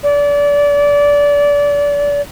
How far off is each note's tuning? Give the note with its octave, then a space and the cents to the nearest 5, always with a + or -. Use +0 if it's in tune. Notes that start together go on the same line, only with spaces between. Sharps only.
D5 -25